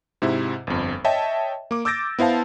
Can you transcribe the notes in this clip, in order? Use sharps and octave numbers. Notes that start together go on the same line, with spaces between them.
G#2 C3 E4
G1 F2
C#5 D#5 E5 G5 A5
A#3 D6
D6 E6 G6 A6 A#6 D7
B3 E4 C5 F5 A5